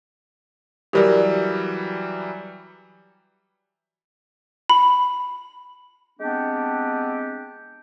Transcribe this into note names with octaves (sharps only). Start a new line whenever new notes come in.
E3 F#3 G3 G4 A#4 D5
B5
G#3 B3 C4 D4 G4